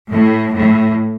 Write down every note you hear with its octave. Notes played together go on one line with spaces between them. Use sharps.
A2
A2